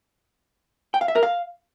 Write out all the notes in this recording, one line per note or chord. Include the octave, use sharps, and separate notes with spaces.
G5
F5
E5
A#4
F5